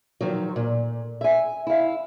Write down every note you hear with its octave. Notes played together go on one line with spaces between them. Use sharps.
D#3 F3 F#3
A#2
E5 G#5
E4 F5